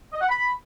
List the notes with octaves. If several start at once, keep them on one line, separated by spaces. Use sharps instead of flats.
D#5
F#5
B5